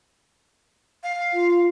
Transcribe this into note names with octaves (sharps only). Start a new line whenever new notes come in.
F5
F4